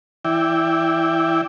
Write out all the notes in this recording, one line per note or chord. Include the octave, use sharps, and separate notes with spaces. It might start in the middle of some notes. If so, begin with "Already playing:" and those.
E3 E4 D5 G5